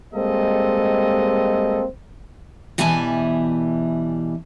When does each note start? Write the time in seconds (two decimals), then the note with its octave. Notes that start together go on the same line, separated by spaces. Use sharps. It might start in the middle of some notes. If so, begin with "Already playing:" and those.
0.14 G3 G#3 A#3 C4 A4 D#5
2.78 B2 E3 G3 E5 G#5 A5